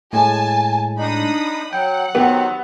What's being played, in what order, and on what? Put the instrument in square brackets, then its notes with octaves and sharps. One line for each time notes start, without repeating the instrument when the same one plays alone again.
[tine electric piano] A2 G#3 [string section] G#5 A5
[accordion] D4 D#4 [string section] B5 D#6
[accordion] F#3 [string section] F#5 [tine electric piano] G5
[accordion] D#3 F#3 C4 [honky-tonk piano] B3 [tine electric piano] G4